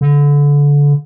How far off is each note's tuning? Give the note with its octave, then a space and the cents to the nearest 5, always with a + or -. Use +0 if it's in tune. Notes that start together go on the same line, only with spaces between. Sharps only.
D3 -25